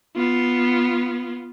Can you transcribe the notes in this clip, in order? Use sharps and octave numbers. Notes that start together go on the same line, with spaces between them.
B3 F4